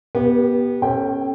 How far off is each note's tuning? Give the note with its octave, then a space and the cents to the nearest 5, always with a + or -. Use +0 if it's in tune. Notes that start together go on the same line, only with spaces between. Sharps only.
B3 -25 G4 +0
C#4 -25 A4 +0 G5 +0